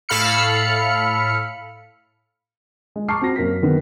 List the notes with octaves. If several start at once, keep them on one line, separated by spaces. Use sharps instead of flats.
A2 A4 F5 B5 F6 C#7
G#3
A5 A#5 C#6 D6 F6 C7
C4 F#4 A#6
F#2 A#3 F#4 B6
D#3 F#3 B3